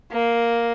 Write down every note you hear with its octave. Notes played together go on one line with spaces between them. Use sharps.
A#3